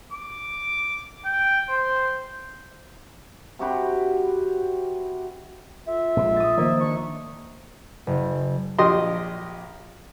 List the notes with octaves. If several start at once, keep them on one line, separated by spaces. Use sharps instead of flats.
D6
G5
C5
C3 F#4 G4 B5
F4 A4 E5
A#1 F3 G#3
D#6 A6
D#3 F3 A#3 E5
D4 D5 C#6
F#1
A#1 G4 D#5 C6